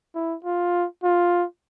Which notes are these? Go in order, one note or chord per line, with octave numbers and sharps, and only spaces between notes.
E4
F4
F4